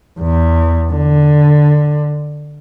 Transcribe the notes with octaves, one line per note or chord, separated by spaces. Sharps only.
E2
D3